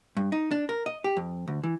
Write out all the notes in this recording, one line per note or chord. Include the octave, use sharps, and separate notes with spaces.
G2
D#4
D4
A#4
D#5
G4
F2
D2
E3